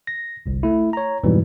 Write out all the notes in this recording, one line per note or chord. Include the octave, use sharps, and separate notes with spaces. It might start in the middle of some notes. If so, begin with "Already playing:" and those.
A#6
G1 C2
A3 E4
C#5 A#5
F2 G#2 B2 E3 G3